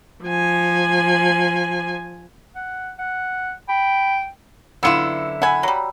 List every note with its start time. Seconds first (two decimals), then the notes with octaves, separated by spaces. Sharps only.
0.24 F3 G#5
2.55 F#5
2.99 F#5
3.69 G5 B5
4.83 F#2 D3 B3 E4 F4 E6 C#7 E7
5.42 E5 F#5 G#5 B5
5.63 F#3 G3